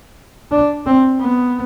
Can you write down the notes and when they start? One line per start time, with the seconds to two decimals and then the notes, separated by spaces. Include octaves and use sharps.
0.51 D4
0.86 C4
1.21 B3